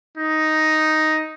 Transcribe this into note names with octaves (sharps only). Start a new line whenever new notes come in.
D#4